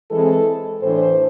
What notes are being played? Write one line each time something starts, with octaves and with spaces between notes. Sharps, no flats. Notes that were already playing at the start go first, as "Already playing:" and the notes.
E3 G#3 C4 A4
A2 E3 A3 D4 C5